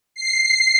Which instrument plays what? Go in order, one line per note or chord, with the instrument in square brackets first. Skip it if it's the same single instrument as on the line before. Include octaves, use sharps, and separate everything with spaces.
[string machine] C7